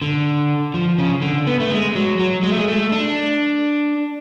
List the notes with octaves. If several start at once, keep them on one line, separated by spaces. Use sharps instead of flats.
D3
F3
C#3
D3
B3
A3
G#3
F#3
F#3
G#3
A3
G#3
A3
D4